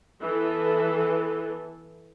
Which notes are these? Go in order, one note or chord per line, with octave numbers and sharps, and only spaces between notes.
E3 B3 A4